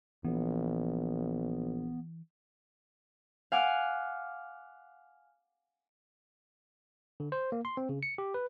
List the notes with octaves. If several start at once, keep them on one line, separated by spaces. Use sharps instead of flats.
A#1 E3 B3
F5 F#5 G#5 D6 F6
D3
C5
A#3
C6
C4
C#3
C#7
G4
B4